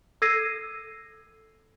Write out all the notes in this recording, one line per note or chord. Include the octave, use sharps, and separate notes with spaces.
A4 E6 G#6 A#6 C7 D#7